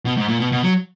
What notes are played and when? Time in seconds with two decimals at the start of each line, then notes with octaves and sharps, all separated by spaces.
0.05 B2
0.17 G#2
0.28 A#2
0.40 B2
0.52 B2
0.63 F#3